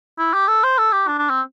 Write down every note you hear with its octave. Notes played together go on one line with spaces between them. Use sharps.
E4
G4
A4
C5
A4
G4
D4
D4
C4